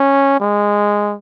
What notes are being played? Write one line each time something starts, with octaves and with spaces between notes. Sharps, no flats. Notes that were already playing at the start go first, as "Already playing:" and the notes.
Already playing: C#4
G#3